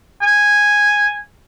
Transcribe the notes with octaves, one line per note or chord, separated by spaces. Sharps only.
G#5